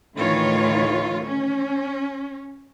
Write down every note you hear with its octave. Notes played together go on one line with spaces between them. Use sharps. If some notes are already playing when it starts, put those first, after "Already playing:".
D2 A2 D#3 E3 F4 C#5
C#4